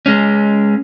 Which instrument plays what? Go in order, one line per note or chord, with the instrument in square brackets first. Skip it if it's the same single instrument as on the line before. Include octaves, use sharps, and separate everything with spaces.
[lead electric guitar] G#3 C#4